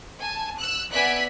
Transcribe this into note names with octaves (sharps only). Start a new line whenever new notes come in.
G#5 A5
E6 F#6
B3 D5 E5 G#5 F#6 B6